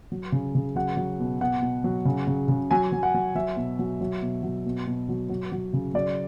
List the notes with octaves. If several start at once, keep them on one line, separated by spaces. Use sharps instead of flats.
F#3
C#3
C#3
F#3 F#5
F#3
B2
B2 F#5
B2
F#3
C#3
C#3
C#3
F#3 G#5
F#3
F#5
F#3
F#3 E5
B2
F#3
F#3
B2
F#3
B2
B2
F#3
F#3
F#3
C#3
F#3 D5